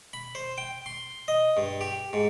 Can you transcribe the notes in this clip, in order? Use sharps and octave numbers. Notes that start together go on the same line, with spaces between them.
B5
C5
G5
C6
D#5
G2
G4
G#2